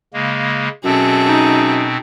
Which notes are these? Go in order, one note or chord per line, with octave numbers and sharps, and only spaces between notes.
C#3 G#3 A#3
F#2 B2 C4 G#4 A4
D#4